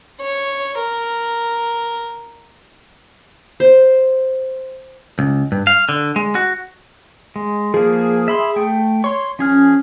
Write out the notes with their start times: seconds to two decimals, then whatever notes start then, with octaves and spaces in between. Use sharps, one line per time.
0.22 C#5
0.79 A#4
3.60 C5
5.19 C#2
5.52 G2
5.67 F5
5.89 D3
6.16 G#3
6.35 F#4
7.36 G#3
7.74 F3 A#3 G#4
8.28 E5 B5 C6
8.56 A3 G5
9.04 C#5 C6 C#6
9.39 F3 C#4 G#4 F6